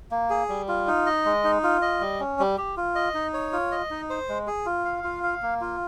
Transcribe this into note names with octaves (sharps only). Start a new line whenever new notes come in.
A#3
G#4
G3
F4
D#4
D#5
G#3
D#4
F4
D#5
G3
C#4
G3
G4
F4
D#5
D#4
C#5
F4
D#5
D#4
C5
G#3
G#4
F4
F5
F4
F5
A#3
F4